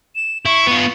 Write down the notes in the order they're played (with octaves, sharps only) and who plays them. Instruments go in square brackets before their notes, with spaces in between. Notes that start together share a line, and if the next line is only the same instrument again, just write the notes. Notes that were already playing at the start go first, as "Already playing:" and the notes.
[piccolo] E7
[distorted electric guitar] E4 [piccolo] C#6
[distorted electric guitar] B3 F4